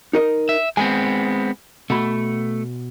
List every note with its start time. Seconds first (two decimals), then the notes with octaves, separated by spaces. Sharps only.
0.13 D#4 A#4 D#5
0.49 E5
0.77 G#3 B3 C4 G#5
1.90 B2 A3 B5